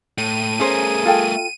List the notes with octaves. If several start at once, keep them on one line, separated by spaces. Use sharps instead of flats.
A2 D#7
A3 C#4 G#4 A#4 C5
F4 A4 G5